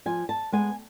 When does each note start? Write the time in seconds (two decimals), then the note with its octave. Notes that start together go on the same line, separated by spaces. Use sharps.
0.06 F3 G#5
0.29 A5
0.52 G#3 B3 G#5